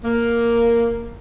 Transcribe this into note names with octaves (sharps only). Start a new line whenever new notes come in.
A#3